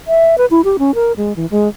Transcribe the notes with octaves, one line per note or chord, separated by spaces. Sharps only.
E5
B4
E4
G4
C#4
A#4
G#3
E3
G#3